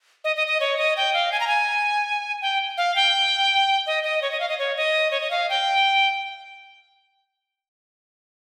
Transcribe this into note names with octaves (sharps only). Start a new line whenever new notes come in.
D#5
D#5
D#5
C#5
D#5
G5
F5
G#5
A#5
G#5
G5
F5
G5
D#5
D#5
C#5
D#5
F5
D#5
C#5
D#5
C#5
D#5
F5
G5